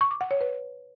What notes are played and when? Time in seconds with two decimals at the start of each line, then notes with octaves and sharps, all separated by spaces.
0.01 C#6
0.11 D6
0.21 F#5
0.31 C#5
0.41 B4